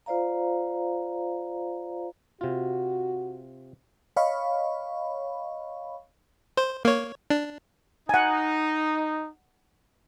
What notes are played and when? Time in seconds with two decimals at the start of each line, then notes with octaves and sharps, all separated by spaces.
0.06 F4 C5 D5 F5 A#5
2.41 C3 F4 F#4
4.16 C#5 D#5 F5 B5 C#6
6.57 C5
6.85 A#3 C#5
7.30 D4
8.09 D#4 F#5 G#5